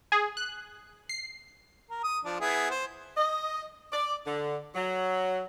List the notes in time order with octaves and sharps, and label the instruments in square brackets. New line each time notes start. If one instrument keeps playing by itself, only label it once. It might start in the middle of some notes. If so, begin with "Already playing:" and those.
[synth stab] G#4
F#6
C7
[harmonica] A#4
D#6
F3 D4
B3 E4 G#4
C5
[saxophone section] D#5
D5
D3
F#3